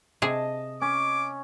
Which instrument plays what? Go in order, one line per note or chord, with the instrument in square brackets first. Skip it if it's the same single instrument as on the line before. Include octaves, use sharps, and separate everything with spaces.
[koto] C3 G#4 [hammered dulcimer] D#5 A5
[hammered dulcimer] C#4 [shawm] D6